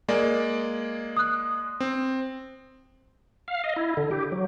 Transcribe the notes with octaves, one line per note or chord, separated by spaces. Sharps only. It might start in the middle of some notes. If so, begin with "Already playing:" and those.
G#3 A#3 D5
D#6 F#6
C4
F5
D#5
E4
D3
G4
F#3